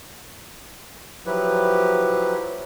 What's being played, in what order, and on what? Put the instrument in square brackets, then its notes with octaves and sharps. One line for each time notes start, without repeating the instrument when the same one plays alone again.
[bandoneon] F3 F#3 E4 G4 B4